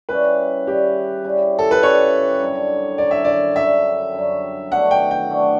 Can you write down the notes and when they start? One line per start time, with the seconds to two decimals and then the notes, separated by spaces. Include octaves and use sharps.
0.09 C#3 G3 C#4 E4 B4
0.67 C#3 G3 C#4 E4 G4
1.24 C#3 G3 C#4 E4
1.59 A4
1.71 B4
1.82 C#3 G3 C#4 E4 C#5
2.40 F#2 D3 G3
2.98 F#2 D3 G3 D5
3.11 E5
3.24 D5
3.56 F#2 D3 G3 E5
4.14 F#2 D3 G3
4.71 B2 A3 D4 F#4 F#5
4.91 G5
5.11 G5
5.30 B2 A3 D4 F#4